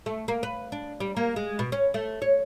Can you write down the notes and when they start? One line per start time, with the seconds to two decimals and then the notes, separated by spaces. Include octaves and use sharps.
0.06 A3
0.28 A#3
0.43 B4
0.72 D4
1.00 G3
1.17 A#3
1.36 G#3
1.59 B2
1.72 C#4
1.94 A3
2.22 C#5